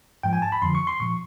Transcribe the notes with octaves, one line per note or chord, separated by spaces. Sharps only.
G#2 F3 G5
G#5
A5
B5
F2 D3 F3 C6
C#6
C6
A#2 F3 C#6